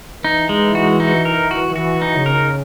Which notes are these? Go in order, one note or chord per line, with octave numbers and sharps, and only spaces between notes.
E3 D#4
G#3
F#4
D#4
A#4
F#4
E3 F#4
D#4
C#3 A#4